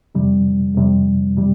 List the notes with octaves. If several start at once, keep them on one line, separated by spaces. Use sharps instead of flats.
F2 C3 G3
F2 C3 G3
C3 G3